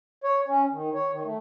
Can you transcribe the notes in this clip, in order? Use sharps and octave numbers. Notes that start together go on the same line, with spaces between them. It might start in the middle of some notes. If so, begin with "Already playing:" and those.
C#5
C#4
D#3
C#5
D#3
A3